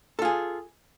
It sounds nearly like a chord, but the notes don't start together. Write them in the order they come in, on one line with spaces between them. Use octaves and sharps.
A4 F4 G#4